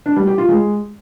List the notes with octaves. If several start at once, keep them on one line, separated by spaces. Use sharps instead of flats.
D4
G3
G4
F4
G#3